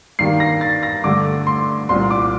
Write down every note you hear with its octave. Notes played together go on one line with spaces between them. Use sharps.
G2 D#3 G3 A#3 C7
A#6
A6
A#6
G2 D3 A3 D6
C6
C2 A#2 G3 C6
D6